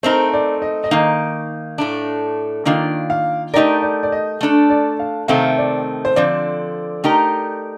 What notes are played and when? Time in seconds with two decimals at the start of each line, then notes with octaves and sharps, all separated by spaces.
0.03 A3 C4 D#4 A#4 C5
0.33 D5
0.62 D#5
0.84 D#5
0.91 D#3 A#3 D#4 F5
1.78 A2 A3 D4
2.65 D#3 A#3 D4 F4
3.10 F5
3.54 A3 D#4 G4 A#4 D5
3.83 D5
4.03 D5
4.12 D#5
4.41 A3 D4 A4
4.70 D5
4.99 F5
5.28 C3 D#3 A3 C4 F5
5.58 D5
6.05 C5
6.16 D3 F3 C4 D5
7.04 A3 D#4 G4 A#4